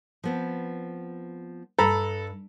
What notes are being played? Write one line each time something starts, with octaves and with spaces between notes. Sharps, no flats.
F3 B3 C4
G2 A4 A#5 B5